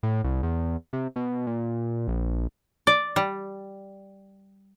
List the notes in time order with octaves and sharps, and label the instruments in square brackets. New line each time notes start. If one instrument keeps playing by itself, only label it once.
[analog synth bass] A2
C2
E2
C3
B2
A#2
A#1
[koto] D5
G3